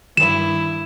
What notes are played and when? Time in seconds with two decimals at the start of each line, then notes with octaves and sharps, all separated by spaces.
0.17 G2 D#3 E4 E7